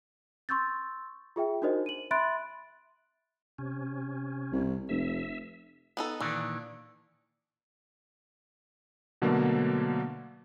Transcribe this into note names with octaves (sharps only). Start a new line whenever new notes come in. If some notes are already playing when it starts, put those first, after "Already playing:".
C6 C#6 E6 G6 A6
F4 G#4 E5 G5
D4 D#4 F#4 A#4 C5 D#5
D#7 F#7
E5 B5 C6 F#6 A6 D7
C3 C#4
C2
F1 E5
B3 D#4 A4
A#2 D#3 E3 D4
B2 D3 F#3 A3 A#3